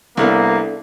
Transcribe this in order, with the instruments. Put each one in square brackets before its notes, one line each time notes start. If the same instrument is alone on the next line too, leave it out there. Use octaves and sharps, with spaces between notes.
[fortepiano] C2 B3 [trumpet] A#3 [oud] D4 A4 A#4